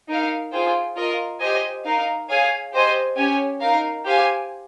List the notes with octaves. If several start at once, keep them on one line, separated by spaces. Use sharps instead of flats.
D#4 A#4 F5
F4 G#4 C5 G5
F4 A#4 D#5
G4 C5 D#5 G#5
D#4 A#4 F5
G#4 C#5 F5 G#5
G4 C5 D#5 G#5
C#4 G4 C#5 G#5
D#4 A#4 F5
G4 C5 F5 G#5